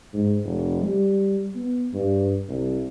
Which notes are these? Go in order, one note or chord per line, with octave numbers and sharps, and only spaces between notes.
G#2
F1
G3
B3
G2
C2